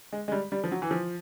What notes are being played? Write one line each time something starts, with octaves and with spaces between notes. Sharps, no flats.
G#3
G#3
G3
G3
F3
F#3
E3
F3